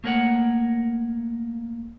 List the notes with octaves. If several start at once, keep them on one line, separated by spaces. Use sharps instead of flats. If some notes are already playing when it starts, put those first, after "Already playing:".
A3 A#3 A#4 C#5 F#5